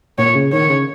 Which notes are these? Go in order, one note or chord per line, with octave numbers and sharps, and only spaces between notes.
A#2 C#5
C#3
D#3 C#5
C#3